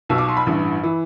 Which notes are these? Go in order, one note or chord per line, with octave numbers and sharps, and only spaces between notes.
B1 B2 E6
D6
C6
B5
A1 G2 E3
E3